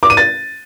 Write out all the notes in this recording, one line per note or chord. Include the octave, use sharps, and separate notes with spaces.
D6
D#7
A6